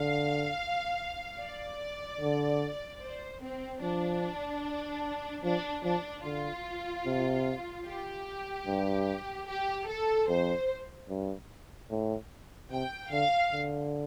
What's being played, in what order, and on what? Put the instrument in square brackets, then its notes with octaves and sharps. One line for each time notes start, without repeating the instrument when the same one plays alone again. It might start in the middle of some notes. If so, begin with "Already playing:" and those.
Already playing: [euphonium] D3 [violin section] F5
[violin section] D5
[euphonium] D3
[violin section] C5
C4
[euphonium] F3 [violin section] D4
[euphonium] F3 [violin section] D4
[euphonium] F3 [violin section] D4
[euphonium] D3 [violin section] F4
[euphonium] C3
[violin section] G4
[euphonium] G2
[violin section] G4
A4
[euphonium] F2 [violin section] C5
[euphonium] G2
A2
[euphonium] C3 [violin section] G5
[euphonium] D3 [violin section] F5
[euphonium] D3